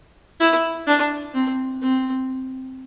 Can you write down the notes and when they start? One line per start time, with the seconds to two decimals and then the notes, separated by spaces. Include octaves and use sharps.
0.40 E4
0.87 D4
1.34 C4
1.82 C4